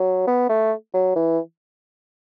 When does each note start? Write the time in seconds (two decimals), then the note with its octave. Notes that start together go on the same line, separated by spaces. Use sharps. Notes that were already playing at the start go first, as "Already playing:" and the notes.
Already playing: F#3
0.27 B3
0.49 A3
0.94 F#3
1.16 E3